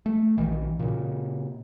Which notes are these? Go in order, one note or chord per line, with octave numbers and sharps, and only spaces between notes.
A3
A#1 D#3 E3
A#2 C#3